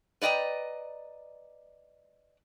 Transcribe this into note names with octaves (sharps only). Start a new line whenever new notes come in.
B4 D5 D#5 G5 A#5